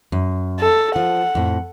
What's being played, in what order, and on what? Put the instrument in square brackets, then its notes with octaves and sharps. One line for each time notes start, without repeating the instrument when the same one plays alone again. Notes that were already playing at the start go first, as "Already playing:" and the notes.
[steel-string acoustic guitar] F#2
[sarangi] A4
[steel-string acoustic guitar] F3 [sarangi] F#5
[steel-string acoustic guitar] F2 A2